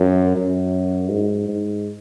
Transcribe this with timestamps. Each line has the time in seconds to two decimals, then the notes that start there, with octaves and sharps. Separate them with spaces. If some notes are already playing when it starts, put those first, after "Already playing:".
Already playing: F#2
0.37 F#2
1.10 G#2
1.48 G#2